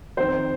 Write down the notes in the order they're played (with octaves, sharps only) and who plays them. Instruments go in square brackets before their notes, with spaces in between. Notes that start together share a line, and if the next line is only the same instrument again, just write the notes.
[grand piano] F2 D#3 C5